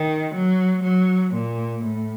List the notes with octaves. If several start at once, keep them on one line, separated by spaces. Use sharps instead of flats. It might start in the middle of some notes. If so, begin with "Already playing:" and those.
Already playing: D#3
F#3
F#3
A#2
A2